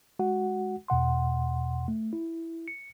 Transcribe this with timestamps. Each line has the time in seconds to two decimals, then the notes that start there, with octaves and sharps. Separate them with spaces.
0.19 G#3 F#4 F#5
0.88 E2 B2 F#5 C6
1.88 A3
2.13 E4
2.68 C#7